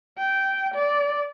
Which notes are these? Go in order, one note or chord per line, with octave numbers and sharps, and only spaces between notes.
G5
D5